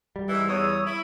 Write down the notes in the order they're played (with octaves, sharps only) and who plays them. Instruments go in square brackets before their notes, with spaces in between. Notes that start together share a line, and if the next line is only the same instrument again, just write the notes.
[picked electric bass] G3
[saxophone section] G#2 D#3 E3 [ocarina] E6
[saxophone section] E2 [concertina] C#5 D#6
[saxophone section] E4